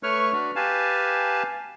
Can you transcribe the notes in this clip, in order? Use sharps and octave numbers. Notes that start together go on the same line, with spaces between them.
A3 B4 C#5 C#6 F6
D4 F#4 B4
G4 B4 F5 G#5 A5